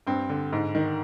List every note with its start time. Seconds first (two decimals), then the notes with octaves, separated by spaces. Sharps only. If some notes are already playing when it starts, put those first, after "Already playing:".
0.07 G2 C4
0.29 D3
0.53 G#2
0.75 D#3